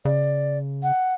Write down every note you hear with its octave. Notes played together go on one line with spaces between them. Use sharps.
C#3 D5
F#5